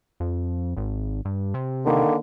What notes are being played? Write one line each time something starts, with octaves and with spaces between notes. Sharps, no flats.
F2
G#1
G2
C3
D3 D#3 A#3